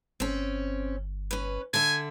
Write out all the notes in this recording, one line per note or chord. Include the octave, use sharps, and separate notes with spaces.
G1 C4 C#4
C#4 B4
D3 E5 G#5